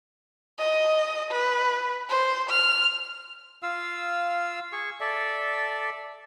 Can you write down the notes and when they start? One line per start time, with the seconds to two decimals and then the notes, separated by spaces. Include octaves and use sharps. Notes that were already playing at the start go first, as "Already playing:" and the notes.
0.58 D#5
1.31 B4
2.09 C5
2.50 F6
3.63 F4 F5 E6
4.72 G#4 C#6
5.00 A4 D5 E5